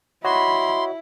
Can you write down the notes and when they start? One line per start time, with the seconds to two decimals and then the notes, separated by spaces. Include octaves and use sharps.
0.25 E4 F#4 C#5 D#5 B5 C6